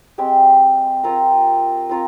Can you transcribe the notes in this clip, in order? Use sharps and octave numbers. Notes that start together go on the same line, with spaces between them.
G#3 C4 G4
C4 F4 A#4
C4 F4 A#4